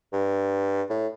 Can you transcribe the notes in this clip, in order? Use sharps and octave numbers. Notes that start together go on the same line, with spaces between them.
G2
A2